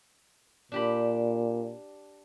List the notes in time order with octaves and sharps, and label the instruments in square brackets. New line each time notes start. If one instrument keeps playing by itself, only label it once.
[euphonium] A#2 [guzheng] D4 G4 B5